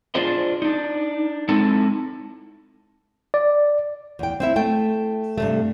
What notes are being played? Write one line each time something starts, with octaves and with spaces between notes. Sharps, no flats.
D4 F4 G#4 C5 D#5
D4 D#4
G#3 C4 D#4 E4 A4 A5
D5
E2 G5
C4 E4 E5
A3 G5
G2 C3 A3